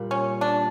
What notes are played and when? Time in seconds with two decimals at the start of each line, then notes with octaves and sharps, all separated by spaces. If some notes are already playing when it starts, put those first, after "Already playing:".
Already playing: A#2 G3 A#3
0.11 C#4
0.41 D4